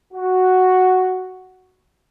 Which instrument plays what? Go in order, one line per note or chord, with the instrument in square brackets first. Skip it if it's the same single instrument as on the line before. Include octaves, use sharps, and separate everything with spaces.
[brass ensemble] F#4